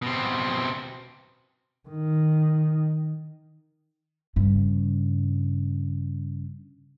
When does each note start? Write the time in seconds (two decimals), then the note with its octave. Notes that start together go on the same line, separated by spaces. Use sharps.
0.02 B2 C4
1.89 D#3
4.36 G2 C#3